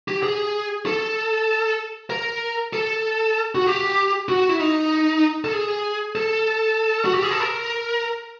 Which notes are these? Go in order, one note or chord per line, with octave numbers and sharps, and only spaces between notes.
G4
G#4
A4
A#4
A4
F#4
G4
F#4
E4
D#4
A4
G#4
A4
F#4
G4
G#4
A4
A#4